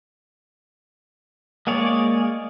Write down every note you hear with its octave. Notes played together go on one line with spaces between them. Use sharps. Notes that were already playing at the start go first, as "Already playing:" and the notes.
G#3 A#3 G#4 C#5 D5